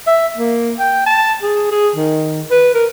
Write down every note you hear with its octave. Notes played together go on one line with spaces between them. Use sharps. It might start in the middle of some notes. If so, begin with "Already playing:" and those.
E5
A#3
G5
A5
G#4
G#4
D#3
B4
A#4